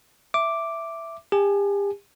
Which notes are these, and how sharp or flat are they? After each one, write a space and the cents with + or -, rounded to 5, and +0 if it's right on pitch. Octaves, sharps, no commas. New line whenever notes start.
E5 +5 D6 +0
G4 +40 G#5 +30